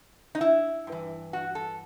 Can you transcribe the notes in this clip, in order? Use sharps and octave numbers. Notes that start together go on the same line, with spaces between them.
D#4
E4
G2
E3
F#4
A4